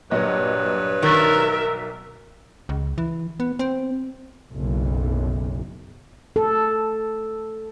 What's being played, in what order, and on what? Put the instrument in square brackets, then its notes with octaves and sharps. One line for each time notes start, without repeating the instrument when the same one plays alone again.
[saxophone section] G2 B4 C#5 [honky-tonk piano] A#2 F#3 D#5
[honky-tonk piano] B1 F#6 A6 [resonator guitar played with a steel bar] D#3 [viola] A#4 E5
[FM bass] C#2
E3
B3
C4
[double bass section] F#1 B1
[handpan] A4